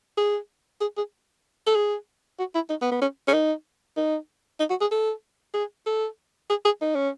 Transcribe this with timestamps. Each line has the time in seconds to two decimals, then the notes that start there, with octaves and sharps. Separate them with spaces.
0.18 G#4
0.81 G#4
0.97 G#4
1.67 A4
1.75 G#4
2.39 F#4
2.54 E4
2.70 D#4
2.81 B3
2.92 B3
3.01 C#4
3.28 C#4
3.33 D#4
3.97 D#4
4.59 D#4
4.70 F#4
4.81 G#4
4.91 A4
5.54 G#4
5.86 A4
6.50 G#4
6.65 G#4
6.81 D#4
6.95 C#4